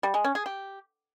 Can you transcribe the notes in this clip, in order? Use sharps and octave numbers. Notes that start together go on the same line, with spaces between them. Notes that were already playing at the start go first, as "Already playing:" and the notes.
G3
G#3
C#4
G#4
G4